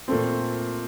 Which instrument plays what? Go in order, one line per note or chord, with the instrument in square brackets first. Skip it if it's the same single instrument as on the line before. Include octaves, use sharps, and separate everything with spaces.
[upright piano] A#2 A3 C4